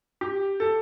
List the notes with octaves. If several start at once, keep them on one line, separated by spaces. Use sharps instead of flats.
G4
A4